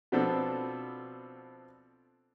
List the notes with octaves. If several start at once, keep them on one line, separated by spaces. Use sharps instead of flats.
B2 F3 B3 C4 D4 A4